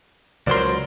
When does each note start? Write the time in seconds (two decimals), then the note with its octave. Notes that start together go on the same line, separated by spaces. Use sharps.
0.47 C#2 F#3 A#4 C5 D5 C6